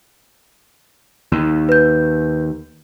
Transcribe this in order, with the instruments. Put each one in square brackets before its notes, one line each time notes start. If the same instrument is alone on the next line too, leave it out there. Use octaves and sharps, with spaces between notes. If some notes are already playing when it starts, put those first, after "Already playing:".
[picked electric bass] D#2
[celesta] B4 G6